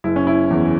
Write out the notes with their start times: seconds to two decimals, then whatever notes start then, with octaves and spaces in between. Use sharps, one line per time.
0.04 F#1 E4
0.16 C#4
0.27 E4
0.51 E2 E3